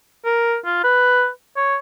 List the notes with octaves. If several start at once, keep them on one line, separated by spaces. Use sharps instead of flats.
A#4
F4
B4
C#5